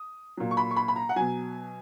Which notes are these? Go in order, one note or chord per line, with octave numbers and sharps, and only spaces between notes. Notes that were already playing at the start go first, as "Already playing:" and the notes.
Already playing: D#6
A#2 F#3
C#6
B5
C#6
B5
B5
A#5
F#5
B2 F#3 G#5